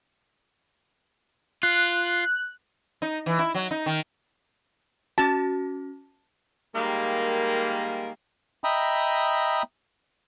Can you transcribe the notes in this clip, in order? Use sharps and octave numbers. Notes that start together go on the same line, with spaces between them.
F4 F#6
D#4
E3
E4
F#3
D#4
D#3
C#4 F#4 A5
D#3 G3 G#3 A#3
D#5 E5 G5 A#5 B5 D#6